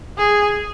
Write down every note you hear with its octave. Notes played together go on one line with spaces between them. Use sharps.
G#4